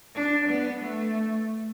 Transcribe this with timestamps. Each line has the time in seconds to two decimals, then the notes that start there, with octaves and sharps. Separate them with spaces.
0.15 D4
0.48 B3
0.81 A3